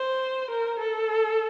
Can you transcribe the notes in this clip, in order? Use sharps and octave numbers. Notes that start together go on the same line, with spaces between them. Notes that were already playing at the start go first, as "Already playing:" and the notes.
Already playing: C5
A#4
A4